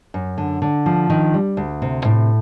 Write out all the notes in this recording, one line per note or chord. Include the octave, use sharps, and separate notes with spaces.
F#2
D3
D3
F3
D#3
G3
D2
C3
A2